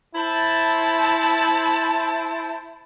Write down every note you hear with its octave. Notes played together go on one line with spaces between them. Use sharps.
E4 C5 A5